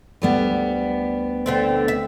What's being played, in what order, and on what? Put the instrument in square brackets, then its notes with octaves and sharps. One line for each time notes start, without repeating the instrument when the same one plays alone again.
[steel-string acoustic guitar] D2 G3 B3
[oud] D3 A3 C4
E5